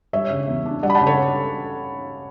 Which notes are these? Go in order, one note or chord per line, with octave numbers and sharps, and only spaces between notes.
G3 C#5 E5
C#3
E2
D4
G3 D5 F#5
B5
F#5 A5
C#3
A4 C#5